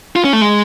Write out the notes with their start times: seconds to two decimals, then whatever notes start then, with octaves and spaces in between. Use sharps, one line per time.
0.16 F4
0.24 C#4
0.33 A3
0.41 G#3